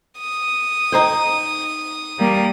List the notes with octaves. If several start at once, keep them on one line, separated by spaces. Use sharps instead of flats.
D#6
D#4 C5 G5
G3 A#3